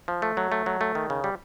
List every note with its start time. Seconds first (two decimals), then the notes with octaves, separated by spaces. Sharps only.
0.08 F3
0.22 A3
0.37 F#3
0.52 A3
0.66 F#3
0.81 A3
0.95 D#3
1.10 C#3
1.24 G3